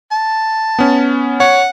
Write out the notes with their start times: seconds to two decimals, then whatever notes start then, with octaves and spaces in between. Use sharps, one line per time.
0.11 A5
0.79 B3 C#4
1.40 C#5 F#5